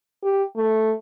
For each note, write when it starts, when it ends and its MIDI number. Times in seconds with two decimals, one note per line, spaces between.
0.23 0.43 67
0.56 0.92 57